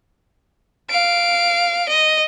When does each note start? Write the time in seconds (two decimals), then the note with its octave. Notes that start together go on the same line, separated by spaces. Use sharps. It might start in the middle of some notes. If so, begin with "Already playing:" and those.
0.90 F5 D7
1.89 D#5